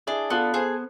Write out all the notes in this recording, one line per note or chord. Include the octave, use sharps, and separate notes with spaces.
D4 E4 G#4
B3 F4 A4
G#4 A4 C5